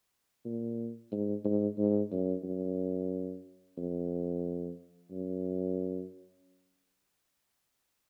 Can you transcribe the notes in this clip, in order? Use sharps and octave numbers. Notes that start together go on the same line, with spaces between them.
A#2
G#2
G#2
G#2
F#2
F#2
F2
F#2